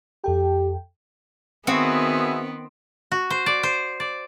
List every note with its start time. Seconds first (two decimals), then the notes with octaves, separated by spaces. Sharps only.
0.24 F2 G4 A4 G5
1.67 D#3 B3 C4 F#4 G#4 B4 E5
3.12 F#4
3.30 C5
3.46 D5
3.63 C5
4.00 D5